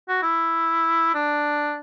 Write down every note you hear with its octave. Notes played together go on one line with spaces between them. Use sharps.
F#4
E4
D4